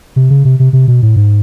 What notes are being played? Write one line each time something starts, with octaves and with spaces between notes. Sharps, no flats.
C3
C#3
C3
C3
C3
B2
A2
G#2